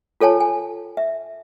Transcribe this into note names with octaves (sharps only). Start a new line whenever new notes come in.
F4 A4 C#5 G#5 A5
G#5
E5